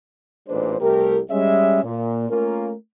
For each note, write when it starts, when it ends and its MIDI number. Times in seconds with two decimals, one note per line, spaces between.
0.48 0.75 33
0.48 0.75 46
0.48 0.75 56
0.48 0.75 62
0.48 0.75 71
0.48 0.75 72
0.81 1.20 36
0.81 1.20 57
0.81 1.20 67
0.81 1.20 70
1.31 1.81 55
1.31 1.81 56
1.31 1.81 61
1.31 1.81 76
1.84 2.30 46
2.30 2.72 57
2.30 2.72 58
2.30 2.72 61
2.30 2.72 65
2.30 2.72 70